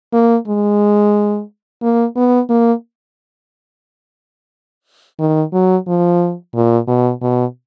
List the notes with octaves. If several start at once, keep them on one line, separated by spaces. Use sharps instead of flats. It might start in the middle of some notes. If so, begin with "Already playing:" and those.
A#3
G#3
A#3
B3
A#3
D#3
F#3
F3
A#2
B2
B2